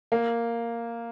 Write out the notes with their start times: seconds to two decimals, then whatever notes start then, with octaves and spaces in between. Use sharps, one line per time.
0.12 A#3